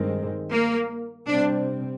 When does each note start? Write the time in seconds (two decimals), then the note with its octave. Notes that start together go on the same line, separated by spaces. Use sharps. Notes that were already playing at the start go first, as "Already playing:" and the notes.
Already playing: G2 D#3 G#3 C4
0.51 A#3
1.28 C3 G3 C4 D4